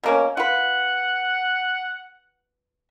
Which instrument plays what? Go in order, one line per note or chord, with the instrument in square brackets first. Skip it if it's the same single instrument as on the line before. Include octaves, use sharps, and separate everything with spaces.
[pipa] B2 A#3 C#4
[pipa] F4 B4 [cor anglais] F#5